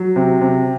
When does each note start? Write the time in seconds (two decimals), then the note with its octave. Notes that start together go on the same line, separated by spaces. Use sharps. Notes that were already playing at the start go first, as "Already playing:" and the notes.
Already playing: F#3
0.16 C3
0.41 C3